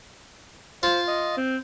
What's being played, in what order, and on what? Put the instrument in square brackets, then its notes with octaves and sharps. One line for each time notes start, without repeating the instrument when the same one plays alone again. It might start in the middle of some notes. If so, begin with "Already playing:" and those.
[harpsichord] F4 [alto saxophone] C5
[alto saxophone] D#5
C4